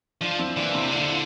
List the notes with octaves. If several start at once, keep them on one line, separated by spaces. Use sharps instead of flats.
F3 D4 F4
C4 E4
E3 A#3 D4
C3 C4 E4
D3 F4
E4
D4 F4